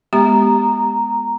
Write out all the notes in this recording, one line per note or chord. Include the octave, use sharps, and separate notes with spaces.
G#3 B3 G4 A#5